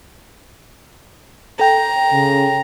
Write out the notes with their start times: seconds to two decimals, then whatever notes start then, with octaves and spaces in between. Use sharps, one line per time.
1.60 A4 G5 A#5
2.12 C#3